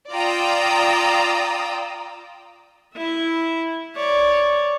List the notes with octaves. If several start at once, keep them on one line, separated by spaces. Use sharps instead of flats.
F4 D5 G5 A#5 D#6 E6
E4 E5
C#5 D5